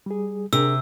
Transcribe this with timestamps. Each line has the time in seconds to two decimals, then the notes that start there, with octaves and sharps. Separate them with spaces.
0.06 G3 G#4
0.53 C3 D4 G#4 A#4 E6